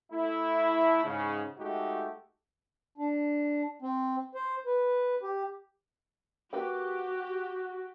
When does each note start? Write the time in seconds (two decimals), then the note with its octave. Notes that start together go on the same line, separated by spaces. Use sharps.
0.12 A3 E4
1.05 G#2 C#3
1.59 G#3 A3 D#4 F#4 G4
2.98 D4
3.82 C4
4.35 C5
4.66 B4
5.23 G4
6.53 A#3 F#4 G4 B4 G5